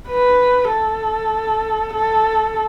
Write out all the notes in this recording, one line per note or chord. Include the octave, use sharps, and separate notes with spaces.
B4
A4
A4